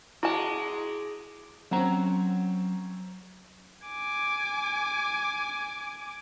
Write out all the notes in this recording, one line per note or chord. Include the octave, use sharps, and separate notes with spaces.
G#3 E4 F#4 A5 D6
F#3 C4 C#4 F#5 A#5
G#5 D6